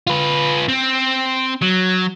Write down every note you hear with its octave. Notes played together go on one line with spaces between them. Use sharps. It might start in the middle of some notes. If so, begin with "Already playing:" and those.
F4 B4
C4
F#3